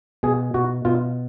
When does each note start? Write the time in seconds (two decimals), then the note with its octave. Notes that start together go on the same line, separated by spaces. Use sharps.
0.23 B2 G#4
0.54 B2 F#4
0.85 B2 F4